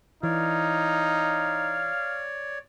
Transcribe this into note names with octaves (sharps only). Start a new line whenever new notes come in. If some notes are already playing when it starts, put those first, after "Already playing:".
E3 D#4 C#5 D5 F5